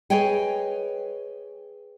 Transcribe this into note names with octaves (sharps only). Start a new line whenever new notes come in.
G#4 B4 C#5 D#5 G5 G#5